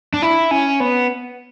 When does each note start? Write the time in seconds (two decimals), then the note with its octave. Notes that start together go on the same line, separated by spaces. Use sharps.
0.14 D4
0.22 E4
0.51 C#4
0.80 B3